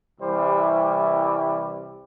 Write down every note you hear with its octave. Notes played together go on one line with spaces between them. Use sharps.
C2 C3 E3 G3 C5